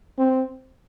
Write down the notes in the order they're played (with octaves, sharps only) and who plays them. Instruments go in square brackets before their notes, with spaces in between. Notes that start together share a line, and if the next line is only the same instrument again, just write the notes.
[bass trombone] C4